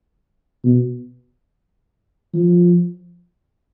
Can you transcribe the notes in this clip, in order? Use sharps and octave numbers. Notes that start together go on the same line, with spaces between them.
B2
F3